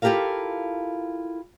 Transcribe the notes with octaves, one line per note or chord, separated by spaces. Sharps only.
E4 F4 G4 A4 A#4 F5